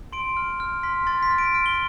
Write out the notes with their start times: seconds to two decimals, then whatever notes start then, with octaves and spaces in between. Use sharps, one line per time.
0.13 C6 D7
0.37 F6
0.60 F6
0.83 C6 B6
1.07 C6 A6
1.23 B6
1.31 F6
1.38 D7
1.55 F6 D7
1.66 G7